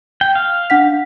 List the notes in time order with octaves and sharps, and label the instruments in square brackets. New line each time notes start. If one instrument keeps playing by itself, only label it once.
[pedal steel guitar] G5
F5
[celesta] D4 F#5 B6